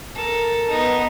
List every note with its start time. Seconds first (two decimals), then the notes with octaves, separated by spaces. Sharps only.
0.15 A4 A#4
0.70 B3 D#4